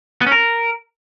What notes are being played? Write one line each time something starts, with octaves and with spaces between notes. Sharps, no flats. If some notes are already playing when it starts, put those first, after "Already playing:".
B3
C#4
A#4